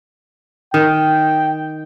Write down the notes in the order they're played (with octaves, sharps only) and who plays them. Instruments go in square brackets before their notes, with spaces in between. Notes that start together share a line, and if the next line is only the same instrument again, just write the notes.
[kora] D#3 [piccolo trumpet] G5